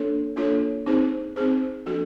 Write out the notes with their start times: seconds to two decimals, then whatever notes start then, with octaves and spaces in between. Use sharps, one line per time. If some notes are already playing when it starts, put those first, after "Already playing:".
Already playing: A#3 D4 F4 A4 C#5
0.36 A#3 D4 F4 A4 C#5
0.86 C4 D#4 G#4 C5
1.36 C4 D#4 G#4 C5
1.86 F3 A#3 D4 F#4 A4